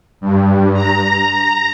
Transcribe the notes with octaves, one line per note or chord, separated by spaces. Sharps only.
G2
A#5